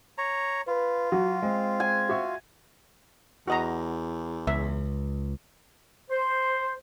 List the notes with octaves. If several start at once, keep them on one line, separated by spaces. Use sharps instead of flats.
C#5 A#5
F4 B4
F#3 F#4
G#3 C4
G#5
F#4 E5 C#6
E2 F#4 D#5 A#5
C#2 E5
C5